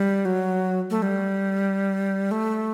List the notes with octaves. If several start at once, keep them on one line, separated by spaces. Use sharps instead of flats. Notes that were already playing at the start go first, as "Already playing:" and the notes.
Already playing: G3
F#3
A3
G3
A3